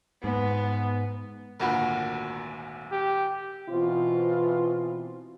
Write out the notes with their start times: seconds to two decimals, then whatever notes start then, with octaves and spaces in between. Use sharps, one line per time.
0.24 G#2 B3
1.60 G#1 D2 A#2 B3 F#4 A#4
2.92 G4
3.70 B2 E3 C4 F4